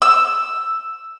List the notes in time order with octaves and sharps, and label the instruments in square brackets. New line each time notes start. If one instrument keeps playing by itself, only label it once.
[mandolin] E6